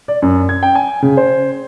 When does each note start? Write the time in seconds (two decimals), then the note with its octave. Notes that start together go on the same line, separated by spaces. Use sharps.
0.08 D5
0.22 F#2
0.49 G#6
0.63 G5
0.75 G#5
1.02 C#3
1.17 C5